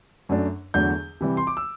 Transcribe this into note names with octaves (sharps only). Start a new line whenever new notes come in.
F#2 F#3 A3 D4
E2 D3 F#3 A3 D4 G6
C3 E3 G3
C6
D6
E6